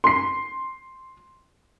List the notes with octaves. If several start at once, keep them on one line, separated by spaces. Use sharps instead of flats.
C6 C7